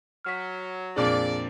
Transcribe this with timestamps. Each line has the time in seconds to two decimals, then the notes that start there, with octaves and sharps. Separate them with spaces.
0.25 F#3 F6 B6
0.96 F2 A#2 D4 G#4 D5 F5